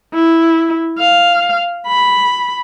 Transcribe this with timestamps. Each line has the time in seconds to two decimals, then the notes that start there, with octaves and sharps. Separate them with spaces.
0.13 E4
0.98 F5
1.87 B5